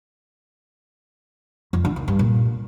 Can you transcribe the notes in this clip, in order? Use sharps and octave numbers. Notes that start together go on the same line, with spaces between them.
F2
D3
D#3
G2
A#2